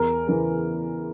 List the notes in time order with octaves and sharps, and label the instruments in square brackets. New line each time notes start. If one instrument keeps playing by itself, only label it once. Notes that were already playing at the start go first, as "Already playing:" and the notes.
Already playing: [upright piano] E2 A#4
C#3 E3 A#4